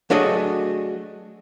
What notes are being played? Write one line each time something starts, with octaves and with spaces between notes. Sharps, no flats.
F#3 A3 D4 F#4 G#4 D#5